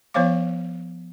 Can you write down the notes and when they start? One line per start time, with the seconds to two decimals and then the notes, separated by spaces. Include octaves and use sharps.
0.14 F3 B3 C5 C#5 F5 D6